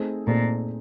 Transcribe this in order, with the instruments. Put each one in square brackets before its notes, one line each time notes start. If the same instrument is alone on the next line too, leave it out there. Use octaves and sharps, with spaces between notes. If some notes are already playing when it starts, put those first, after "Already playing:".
Already playing: [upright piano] A3 C4 D#4 G#4
[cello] A#2 [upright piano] A3 C4 D#4 G#4